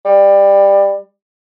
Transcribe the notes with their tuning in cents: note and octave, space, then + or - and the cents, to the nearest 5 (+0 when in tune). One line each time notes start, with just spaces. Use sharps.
G3 +15